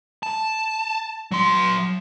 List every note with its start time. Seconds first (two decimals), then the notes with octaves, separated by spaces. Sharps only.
0.23 A5
1.31 F#3 C6